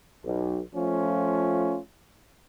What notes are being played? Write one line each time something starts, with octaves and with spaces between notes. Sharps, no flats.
B1
F3 A3 C#4 F4